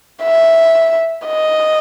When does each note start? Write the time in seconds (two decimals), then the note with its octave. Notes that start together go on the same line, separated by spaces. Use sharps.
0.23 E5
1.27 D#5